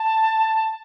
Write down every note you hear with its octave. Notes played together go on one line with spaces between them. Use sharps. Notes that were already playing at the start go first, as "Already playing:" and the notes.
Already playing: A5